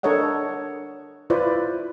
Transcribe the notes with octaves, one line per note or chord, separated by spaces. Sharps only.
D4 A4 A#4 C#5 D#5 F#5
E4 F4 B4 C5 D5